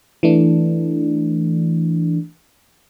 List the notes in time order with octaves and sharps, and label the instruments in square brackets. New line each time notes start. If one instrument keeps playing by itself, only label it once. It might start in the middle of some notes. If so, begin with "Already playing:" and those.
[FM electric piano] E3 A3 D4